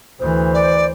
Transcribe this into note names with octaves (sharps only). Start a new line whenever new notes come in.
D2 E3 C5
D5